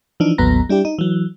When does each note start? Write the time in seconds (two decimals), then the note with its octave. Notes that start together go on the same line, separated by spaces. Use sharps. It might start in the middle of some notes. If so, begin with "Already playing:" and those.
0.20 E3 F3 D4 D#4
0.38 A1 D#2 F#3 B3 A#5 A#6
0.69 G3 D4 E4 G4
0.85 D#4
0.99 E3 F#3